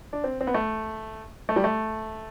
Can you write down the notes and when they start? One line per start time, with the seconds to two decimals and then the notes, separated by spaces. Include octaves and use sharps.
0.13 D4
0.24 C4
0.41 C4
0.47 B3
0.54 A3
1.49 A3
1.56 G3
1.64 A3